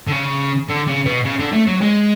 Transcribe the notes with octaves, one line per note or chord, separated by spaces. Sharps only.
D3
C#3
D3
C#3
B2
C#3
D3
A3
F#3
G#3